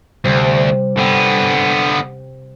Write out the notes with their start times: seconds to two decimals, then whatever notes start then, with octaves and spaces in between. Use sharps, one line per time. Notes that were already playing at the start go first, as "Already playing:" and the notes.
0.24 D2 C3 G3
0.97 D3 B3 G5